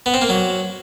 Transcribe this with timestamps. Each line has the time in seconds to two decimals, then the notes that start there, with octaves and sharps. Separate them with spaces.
0.06 B3
0.14 C4
0.22 A#3
0.29 F#3